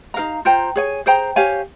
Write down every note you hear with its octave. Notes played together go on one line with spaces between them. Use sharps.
D#4 A#4 F5 A#5
F4 C5 G5 A#5
G#4 C#5 G#5
G#4 C5 G5 A#5
G4 C#5 F5 G#5